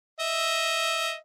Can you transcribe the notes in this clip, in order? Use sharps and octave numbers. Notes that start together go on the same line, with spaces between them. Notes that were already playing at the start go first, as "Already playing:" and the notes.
D#5 E5